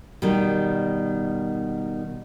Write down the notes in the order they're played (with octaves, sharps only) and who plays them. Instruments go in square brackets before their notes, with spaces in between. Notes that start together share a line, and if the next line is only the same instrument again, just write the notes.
[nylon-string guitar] B2 D#3 G3